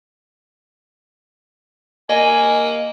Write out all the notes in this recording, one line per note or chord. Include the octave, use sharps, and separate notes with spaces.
A#3 D#5 G#5